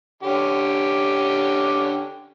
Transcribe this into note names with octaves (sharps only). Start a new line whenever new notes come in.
D3 C#4 G4